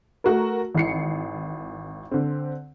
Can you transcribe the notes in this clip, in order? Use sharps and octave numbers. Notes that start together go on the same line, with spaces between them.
A3 F#4 A#4
G#1 E3 C7 C#7
D3 C4